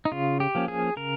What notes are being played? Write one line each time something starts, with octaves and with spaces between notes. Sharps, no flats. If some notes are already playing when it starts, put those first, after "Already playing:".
D#4
C#3 F4
G4
F3 A#3 C#4
G#4
C#3 A#4